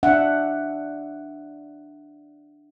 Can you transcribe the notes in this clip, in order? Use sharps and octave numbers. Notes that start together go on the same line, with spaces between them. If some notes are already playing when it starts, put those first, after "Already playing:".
D4 E5 F#5